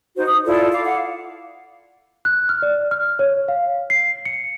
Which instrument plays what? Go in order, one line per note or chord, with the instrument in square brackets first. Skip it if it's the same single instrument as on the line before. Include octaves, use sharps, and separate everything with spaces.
[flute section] D#4 F#4 C5
D#6
E4 F4 A4 D5
F5 D6
F5 F#5
[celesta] F#6
F6
D5
F6
C#5
F5
C7
C#7